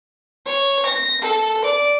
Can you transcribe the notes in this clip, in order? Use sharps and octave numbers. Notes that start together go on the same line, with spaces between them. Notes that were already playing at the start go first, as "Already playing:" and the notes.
C#5
A#6
A4
D5